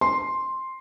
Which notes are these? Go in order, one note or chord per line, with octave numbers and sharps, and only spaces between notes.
C6